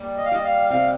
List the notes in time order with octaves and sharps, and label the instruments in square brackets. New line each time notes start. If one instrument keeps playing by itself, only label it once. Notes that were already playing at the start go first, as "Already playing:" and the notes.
Already playing: [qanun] G3 A#3
[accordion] D#5
F5
[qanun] G3 [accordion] D#5
[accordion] F5
[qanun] C3 [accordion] F5